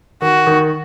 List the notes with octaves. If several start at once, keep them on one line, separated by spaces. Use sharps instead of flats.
D#3 F#4
D#3